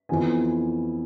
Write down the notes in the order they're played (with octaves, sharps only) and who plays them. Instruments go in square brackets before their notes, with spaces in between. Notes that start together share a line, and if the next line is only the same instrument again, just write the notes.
[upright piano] F2 E3 B3 G#5